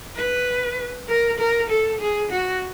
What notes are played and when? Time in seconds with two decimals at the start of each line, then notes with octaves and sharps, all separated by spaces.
0.16 B4
1.09 A#4
1.39 A#4
1.69 A4
2.00 G#4
2.31 F#4